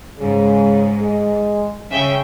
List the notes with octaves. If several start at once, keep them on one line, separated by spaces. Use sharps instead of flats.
G#2 C#3
G#3
C#3 C#4 E5 G5